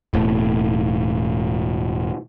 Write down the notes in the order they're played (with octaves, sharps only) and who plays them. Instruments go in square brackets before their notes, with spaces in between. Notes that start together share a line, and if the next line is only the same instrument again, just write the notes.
[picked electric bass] E1 A2